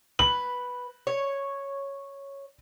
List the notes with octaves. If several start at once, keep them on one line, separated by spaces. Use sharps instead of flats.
B4 F#7
C#5